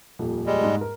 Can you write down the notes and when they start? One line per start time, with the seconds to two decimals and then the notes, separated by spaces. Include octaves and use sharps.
0.19 D#1 F2
0.46 G3 G#3
0.63 G#2
0.81 A#4